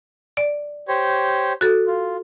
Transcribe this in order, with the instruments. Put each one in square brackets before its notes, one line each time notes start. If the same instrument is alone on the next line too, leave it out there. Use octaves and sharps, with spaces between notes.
[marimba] D5
[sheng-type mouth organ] G4 C5 C#5
[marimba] F#4 A4
[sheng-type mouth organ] F4